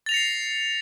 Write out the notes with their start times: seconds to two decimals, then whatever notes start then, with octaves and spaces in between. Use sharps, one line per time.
0.06 A6
0.09 F7
0.11 A#6
0.14 C#7
0.17 C7